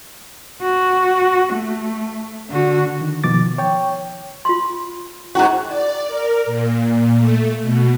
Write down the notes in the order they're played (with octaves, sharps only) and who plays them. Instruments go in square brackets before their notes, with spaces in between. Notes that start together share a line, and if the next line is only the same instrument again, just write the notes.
[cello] F#4
A3
D3 F#4
[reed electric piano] D#3
B2 D#3 F3 D6 A6
C#5 G5
[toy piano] F4 C6
[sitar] G#2 F#4 [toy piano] C#4 E4 A#5
[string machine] D5
A#4
A#2
A3
B2